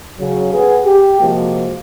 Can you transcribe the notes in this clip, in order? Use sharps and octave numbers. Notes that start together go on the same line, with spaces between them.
C#3 F#3
B3 G#4
G4
C3 F3 G#3 A#3 F#4